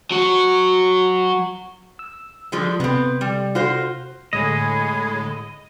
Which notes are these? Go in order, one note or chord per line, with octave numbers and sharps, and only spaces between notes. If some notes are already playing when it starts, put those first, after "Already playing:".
F#3 F#4
E6
F3 G3 G#3
C3 B3 C4
G3
F4 F#4 C5
A2 D3 G#3 G#4 C#5 D#5 B5 G#6